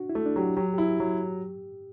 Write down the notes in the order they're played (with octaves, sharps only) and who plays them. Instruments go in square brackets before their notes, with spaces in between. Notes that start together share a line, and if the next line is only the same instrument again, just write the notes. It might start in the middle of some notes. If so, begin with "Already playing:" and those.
Already playing: [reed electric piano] D4 F#4
E4
[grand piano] A3
[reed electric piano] D4
[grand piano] F#3 [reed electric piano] G4
[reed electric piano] F#4
[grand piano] F#3 [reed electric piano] G4
[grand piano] E4 [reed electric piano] G4
[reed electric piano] G4
[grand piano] F#3